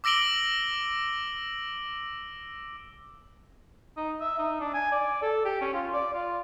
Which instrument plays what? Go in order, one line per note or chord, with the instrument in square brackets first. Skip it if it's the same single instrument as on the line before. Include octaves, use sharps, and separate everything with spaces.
[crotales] D6 E6 A#6 D7 F#7 G7
[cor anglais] D#4
E5
D#4
D4
G#5
D5
A4
G4
C#4
F4
D5
F4